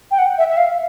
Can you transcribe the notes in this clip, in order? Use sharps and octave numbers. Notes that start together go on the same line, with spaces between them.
G5
F#5
E5
E5
F5